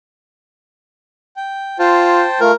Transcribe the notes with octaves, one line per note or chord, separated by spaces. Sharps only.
G5
F4 C5 G5 A5
A3 F4 A#4